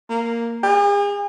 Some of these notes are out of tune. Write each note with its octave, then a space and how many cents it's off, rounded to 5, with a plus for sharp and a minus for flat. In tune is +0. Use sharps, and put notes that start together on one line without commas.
A#3 -5
G#4 -40